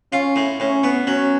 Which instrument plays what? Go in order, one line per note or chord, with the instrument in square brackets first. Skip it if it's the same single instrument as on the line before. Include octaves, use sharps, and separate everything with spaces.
[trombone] C#4 [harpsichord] F4
[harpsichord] A2
[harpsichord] A2 [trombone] C#4
[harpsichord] B3
[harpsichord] F#3 [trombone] C#4